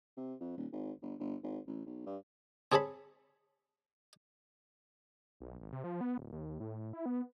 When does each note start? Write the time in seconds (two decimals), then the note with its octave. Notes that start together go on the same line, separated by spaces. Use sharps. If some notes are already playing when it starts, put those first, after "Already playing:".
0.17 C3
0.40 F2
0.57 D#1
0.72 G#1
1.02 G1
1.19 G1
1.43 G#1
1.67 A1
1.86 B1
2.06 G2
2.72 C4 G#4 A4 C#5 A5 B5
5.40 B1
5.61 G#1
5.73 C3
5.84 F3
6.01 B3
6.18 D1
6.33 D#2
6.60 A2
6.93 E4
7.06 B3